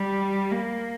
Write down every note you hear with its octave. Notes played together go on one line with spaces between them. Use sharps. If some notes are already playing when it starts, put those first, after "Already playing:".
Already playing: G3
A#3